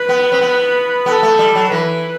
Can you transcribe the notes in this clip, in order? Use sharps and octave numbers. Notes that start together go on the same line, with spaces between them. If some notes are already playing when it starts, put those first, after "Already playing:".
Already playing: B4
B3
C4
B3
B3 A4
A3
G3
F#3
E3 B4